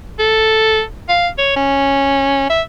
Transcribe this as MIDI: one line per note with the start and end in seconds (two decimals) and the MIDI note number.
0.19 0.82 69
1.09 1.27 77
1.38 1.54 73
1.56 2.48 61
2.49 2.61 76